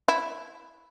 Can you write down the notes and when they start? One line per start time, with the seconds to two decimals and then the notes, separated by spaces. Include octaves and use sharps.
0.08 E4